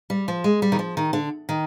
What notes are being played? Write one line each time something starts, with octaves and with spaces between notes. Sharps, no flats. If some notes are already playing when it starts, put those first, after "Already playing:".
G3
F3
G#3
G3
D#3
F3
D#3
D3
D#3